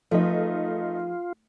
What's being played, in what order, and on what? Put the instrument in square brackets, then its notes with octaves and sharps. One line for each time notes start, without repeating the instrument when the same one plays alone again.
[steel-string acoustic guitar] F3 G#4 B4 [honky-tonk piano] A3 D#4 [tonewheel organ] F4